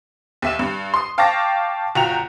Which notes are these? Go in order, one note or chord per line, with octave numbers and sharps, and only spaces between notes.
D#2 E5 E7
G2
C6 D#6
F5 G5 A5 C#6 D6 A#6
F#1 F4 F#4 G5 A#5 F7